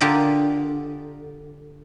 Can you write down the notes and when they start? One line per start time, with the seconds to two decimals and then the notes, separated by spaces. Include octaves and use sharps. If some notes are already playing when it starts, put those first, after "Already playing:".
0.01 D3 F4 G4 A#4 D#5